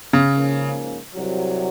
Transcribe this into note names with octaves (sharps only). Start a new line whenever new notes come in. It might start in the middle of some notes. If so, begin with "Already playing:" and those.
C#3
G#2 F3 A#3 C#4
C2 C3 F#3